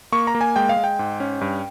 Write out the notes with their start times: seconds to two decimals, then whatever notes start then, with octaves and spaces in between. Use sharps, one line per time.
0.12 A#3 C#6
0.27 A#5
0.35 A#3
0.41 G#5
0.56 G#3 G5
0.69 F5
0.77 G#3
0.84 G5
0.99 G#2
1.20 C#4
1.41 G2